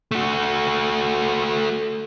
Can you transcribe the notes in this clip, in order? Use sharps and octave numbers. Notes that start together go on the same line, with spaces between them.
A3 F#4